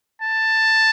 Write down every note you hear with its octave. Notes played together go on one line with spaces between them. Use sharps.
A5